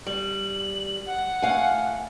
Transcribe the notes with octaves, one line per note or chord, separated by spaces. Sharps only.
G3 F#7
F#5
A2 F5 G#5